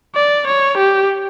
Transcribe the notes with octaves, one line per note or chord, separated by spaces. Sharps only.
D5
C#5
G4